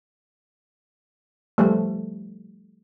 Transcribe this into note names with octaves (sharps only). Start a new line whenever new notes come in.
F3 G3 A3